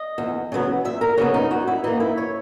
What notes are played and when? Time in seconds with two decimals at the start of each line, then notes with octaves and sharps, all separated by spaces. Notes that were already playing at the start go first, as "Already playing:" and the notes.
Already playing: D#5
0.18 E2
0.52 C#3 F#3 B3
0.85 E2 E5
1.01 A#4
1.17 C#3 F#3 B3 C#4
1.34 D#4
1.51 F#2 F#4
1.67 E4
1.84 E3 A#3 D#4
2.00 E4
2.17 C#5